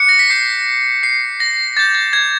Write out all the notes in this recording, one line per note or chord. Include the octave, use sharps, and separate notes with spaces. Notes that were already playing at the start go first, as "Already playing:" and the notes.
Already playing: D6 F#6 C#7
A#6
B6
D6 G6 C7
C7
A#6
D6 G6 A6
A6
G#6